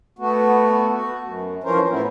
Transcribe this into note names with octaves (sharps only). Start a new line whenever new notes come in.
A3 B3 F#4
F#4
F#2
E3 F3 C#4 A#4 C5
A2 B3 E4